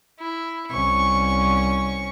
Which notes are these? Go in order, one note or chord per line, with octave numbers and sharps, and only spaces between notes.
E4
C2 C#4 C#6